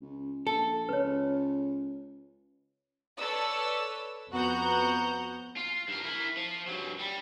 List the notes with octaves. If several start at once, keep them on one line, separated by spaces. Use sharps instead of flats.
C#2
A#1 A4
C#2 B4 C#5
A4 B4 C#5 D5 E6
F2 B3 F#4 F#5 A#5 G6
F4
G2 A#4
E4 A#4
F3
G2 F#3
G3